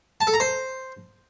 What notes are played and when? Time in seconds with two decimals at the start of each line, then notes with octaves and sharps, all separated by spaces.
0.21 A5
0.27 A4
0.34 A#5
0.40 C5